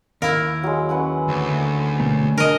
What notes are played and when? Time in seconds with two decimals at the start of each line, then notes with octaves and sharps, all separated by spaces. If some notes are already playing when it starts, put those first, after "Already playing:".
0.22 D#2 E4 A#4 F5
0.63 F#3 G#3
0.89 C#4 B4 F#5
1.28 D2
2.00 B2 A3 A#3
2.38 D4 A#4 D#5